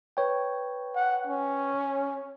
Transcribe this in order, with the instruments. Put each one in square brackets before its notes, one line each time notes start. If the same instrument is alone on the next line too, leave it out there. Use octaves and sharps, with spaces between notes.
[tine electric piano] B4 C#5 G5
[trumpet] F#5
C#4